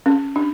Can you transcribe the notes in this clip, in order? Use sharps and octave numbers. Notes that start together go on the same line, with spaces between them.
C#4
D4